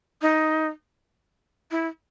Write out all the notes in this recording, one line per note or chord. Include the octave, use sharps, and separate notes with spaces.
D#4
E4